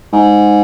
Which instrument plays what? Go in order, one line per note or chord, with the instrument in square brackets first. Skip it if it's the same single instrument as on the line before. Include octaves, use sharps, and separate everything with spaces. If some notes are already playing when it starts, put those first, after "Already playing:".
[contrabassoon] G#2